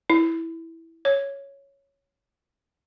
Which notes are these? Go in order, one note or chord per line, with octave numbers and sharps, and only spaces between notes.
E4
C#5